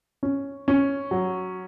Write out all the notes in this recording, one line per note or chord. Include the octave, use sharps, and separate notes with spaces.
C#4
C#4
F#3